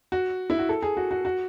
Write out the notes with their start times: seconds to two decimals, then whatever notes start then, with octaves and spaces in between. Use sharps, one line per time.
0.12 F#4
0.50 E4
0.59 F#4
0.69 A4
0.82 G#4
0.97 F#4
1.11 F#4
1.25 F#4